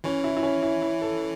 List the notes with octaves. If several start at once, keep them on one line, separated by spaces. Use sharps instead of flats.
E3 C#4
E4
E4
C#4
E4
E4
A4